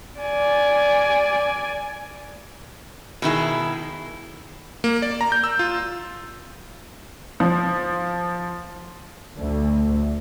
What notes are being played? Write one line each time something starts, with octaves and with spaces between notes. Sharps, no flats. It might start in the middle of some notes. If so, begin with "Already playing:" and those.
D5 G#5
B2 D#3 E4 G#4
A#3
D5
A#5
G6
E6
F4
F3
D2